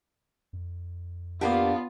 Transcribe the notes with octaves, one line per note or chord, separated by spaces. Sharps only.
F2
A#3 B3 D4 F4 G4 F5